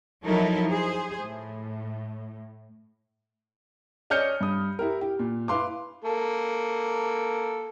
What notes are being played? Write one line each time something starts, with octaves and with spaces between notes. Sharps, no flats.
F3 F#3 D#4 E4 A4 A#4
G#4 C5
A2
C#4 D5 D#5 F6 G6 C#7
G2 D#6
E4 G4 A#4
G4
A#2
E4 B4 F5 C6 D6
A#3 A4